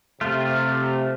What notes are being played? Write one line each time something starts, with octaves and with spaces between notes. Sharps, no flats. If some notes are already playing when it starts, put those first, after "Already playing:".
C3 A3 F4